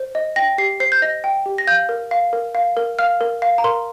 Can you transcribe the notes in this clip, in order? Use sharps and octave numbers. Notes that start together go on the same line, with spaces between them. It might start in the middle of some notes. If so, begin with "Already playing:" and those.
Already playing: C5
D#5
G5 A#6
G4 C7
C5 C7
G6
D#5 A#6
G5
G4
A#6
F5 G6
A#4
F5
A#4
F5
A#4
F5 F6
A#4
F5
A#5
A#4 C6